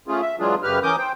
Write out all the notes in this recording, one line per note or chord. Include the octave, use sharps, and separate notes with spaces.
A3 C#4 F4 G#4
E5
E3 F#3 G#3 D4 F4 G#4
F#2 C#3 G4 B4 F6
E3 C#4 A#4 D6 D#6 G6
C5 G5